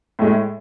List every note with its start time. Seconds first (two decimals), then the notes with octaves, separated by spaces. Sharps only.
0.19 A2 G#3